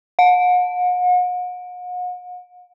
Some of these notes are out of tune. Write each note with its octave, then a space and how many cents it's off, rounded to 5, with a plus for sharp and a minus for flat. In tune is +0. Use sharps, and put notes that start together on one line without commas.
F#5 -45